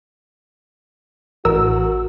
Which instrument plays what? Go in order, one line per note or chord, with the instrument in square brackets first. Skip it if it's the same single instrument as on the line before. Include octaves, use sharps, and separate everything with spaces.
[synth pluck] A1 A#4 E6 [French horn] F#4